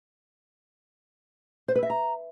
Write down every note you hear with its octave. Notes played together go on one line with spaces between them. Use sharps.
C5
B4
E5
A#5